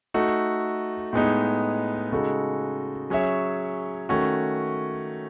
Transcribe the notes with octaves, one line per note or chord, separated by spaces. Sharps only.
A3 D#4 F#4 A4
A2 G#3 B3 D#4
C#3 G#3 D#4 F#4 A4
F#3 C#4 G#4 C#5 E5
D#3 A3 C#4 F#4